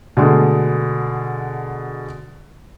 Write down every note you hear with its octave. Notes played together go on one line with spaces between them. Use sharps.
B2 D3 G#3 A3